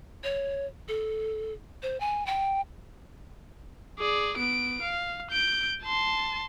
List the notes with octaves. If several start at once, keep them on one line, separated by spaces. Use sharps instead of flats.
C#5
A4
C5
G#5
G5
G#4 D5
B3 D7
F5
G6 D7
A5 C6